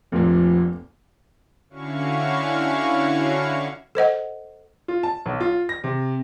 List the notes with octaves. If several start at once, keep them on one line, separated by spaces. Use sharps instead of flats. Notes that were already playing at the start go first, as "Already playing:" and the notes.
F1 D2 A#2 F3 A3 C4
D3 C#4 E4 F#4 F5 C#6
A4 C5 D#5 F#5
F4
A5
B1
F4
A#6
C3